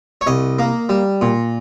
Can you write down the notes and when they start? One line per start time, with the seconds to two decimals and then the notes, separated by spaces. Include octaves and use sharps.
0.21 C#5
0.27 C2 D#5
0.59 A#3
0.89 G3
1.21 A#2